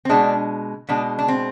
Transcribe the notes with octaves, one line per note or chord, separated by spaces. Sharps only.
C4
B2 G#3 D4
B2 G#3 D4
D4
C4